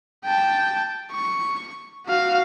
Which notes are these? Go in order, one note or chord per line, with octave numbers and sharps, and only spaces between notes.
G5 A5
C#6
F#4 F5